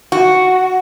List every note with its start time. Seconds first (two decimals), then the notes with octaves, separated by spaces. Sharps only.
0.12 F#4